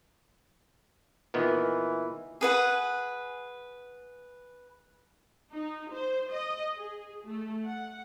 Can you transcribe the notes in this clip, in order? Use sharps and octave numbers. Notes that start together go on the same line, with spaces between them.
A#2 D#3 E3 B3
G#4 B4 F#5
D#4
C5
D#5
G#4
A3
F#5